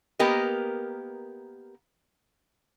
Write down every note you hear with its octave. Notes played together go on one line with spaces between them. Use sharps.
A#3 B3 G4 A#4 D#5